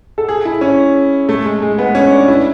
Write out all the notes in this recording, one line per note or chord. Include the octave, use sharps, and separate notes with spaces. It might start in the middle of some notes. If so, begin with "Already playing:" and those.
A4
G#4
E4
C#4
A3
G#3
G#3
B3
C#4
D4
E4